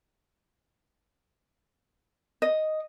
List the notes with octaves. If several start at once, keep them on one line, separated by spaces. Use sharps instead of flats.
D#5